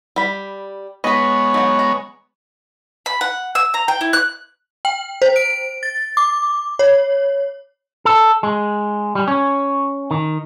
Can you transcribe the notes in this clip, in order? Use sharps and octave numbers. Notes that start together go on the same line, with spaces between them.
G3 B5
G#3 B3 B4 C#5 D#5
F#3 D#4 F#5
A#5
B5
F#5
E6
A#5
G5
E4
F#6
G5
C5
D7
A6
D6
C#5
A4
G#3
G3
C#4
D#3